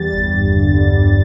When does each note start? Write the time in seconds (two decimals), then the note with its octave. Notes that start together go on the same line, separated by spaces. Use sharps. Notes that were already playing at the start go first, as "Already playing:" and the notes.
Already playing: E2 G3 A6
0.13 G1
0.33 G2
0.54 D3
0.75 G3
0.96 G1